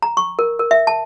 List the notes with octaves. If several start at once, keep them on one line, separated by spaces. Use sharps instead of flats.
A#5
C#6
A#4
A#4
E5
A5